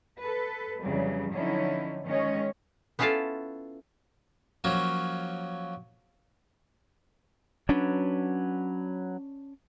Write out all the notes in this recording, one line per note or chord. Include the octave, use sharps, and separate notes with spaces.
A4 B4
F2 C#3 E3 F#3 G3
D3 F3 F#3 C#4 D#4 E4
D#3 G#3 C#4 C#5 D#5
B3 C#4 E4 F4 A4 F5
F3 F#3 A#3 C#4
F#3 C#4 D4 B4